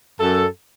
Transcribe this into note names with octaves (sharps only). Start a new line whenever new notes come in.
F#2 A4